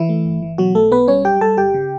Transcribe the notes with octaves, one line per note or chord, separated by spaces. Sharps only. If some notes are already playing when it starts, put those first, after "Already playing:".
Already playing: E3 E4
A3
G1
E3
B2 F#3 F#4
B1 A3 A4
B1 B3 B4
G3 C#4 C#5
F#2 G4 G5
G3 A4 A5
G1 G4 G5
C#3